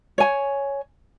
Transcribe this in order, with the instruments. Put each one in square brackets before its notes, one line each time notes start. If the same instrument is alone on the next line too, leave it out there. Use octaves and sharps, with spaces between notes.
[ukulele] C#5 G#5